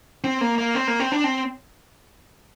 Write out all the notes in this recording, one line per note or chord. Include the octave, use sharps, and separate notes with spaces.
C4
A#3
A#3
C4
A#3
C4
D4
C4